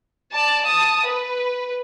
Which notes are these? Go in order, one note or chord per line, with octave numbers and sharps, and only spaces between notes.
D5 A5
A5 D#6
B4